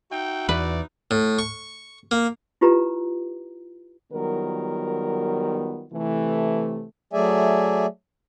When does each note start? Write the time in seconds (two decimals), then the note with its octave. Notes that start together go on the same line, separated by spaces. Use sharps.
0.12 D#4 F#4 E5 G5
0.49 E2 B4 D5
1.11 A2
1.39 C#6
2.11 A#3
2.61 E4 F4 G4 B4 A#5
4.13 D#3 F#3 G3 B3 F4 A#4
5.93 C3 E3 A3
7.13 F#3 A3 G#4 D5 E5 G#5